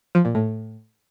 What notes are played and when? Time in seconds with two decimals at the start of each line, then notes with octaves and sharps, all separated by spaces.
0.15 F3
0.25 A#2
0.35 A2